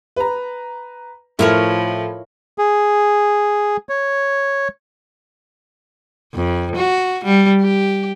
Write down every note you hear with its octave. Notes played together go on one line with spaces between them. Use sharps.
B4 A#5
A2 F3 E4 A#4 C#5
G#4
C#5
F2
F#4
G3
G4